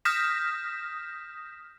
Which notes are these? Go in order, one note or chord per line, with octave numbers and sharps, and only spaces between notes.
D#6 F6 G6 A#6 B6 E7